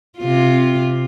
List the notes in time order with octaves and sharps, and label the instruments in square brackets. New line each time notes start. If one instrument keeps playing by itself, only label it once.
[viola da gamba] C3 F4